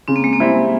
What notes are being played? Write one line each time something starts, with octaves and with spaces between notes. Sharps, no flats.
C#3 C4
A#3
G#3
A#3
G3 C4 E4